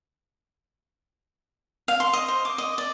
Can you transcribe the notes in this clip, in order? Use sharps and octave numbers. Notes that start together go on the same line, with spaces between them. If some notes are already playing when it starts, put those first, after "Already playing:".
F5
C6
D#5
C5
D6
D#5
D5